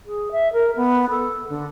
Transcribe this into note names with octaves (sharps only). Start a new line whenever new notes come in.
G#4
E5
A#4
B3
A4
D3